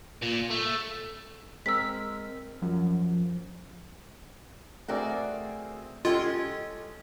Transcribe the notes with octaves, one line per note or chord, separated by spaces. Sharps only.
A#2
A3
G#3 C4 A#4 E6 B6
F#2 F3
A3 C4 F#4 G#4 A#4 D5
G#3 C#4 F4 G4 A4 D#5